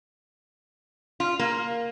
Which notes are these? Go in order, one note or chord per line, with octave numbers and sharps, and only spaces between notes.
F4
A#3